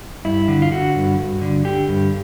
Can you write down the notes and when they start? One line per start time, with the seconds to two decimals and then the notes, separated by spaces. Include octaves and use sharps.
0.25 G2 E4
0.48 D3
0.62 F4
0.71 D3 F#4
0.95 G2
1.19 G2
1.41 D3
1.65 D3 G4
1.88 G2